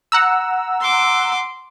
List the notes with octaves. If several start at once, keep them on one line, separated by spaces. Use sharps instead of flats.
F#5 A#5 E6
C6 D6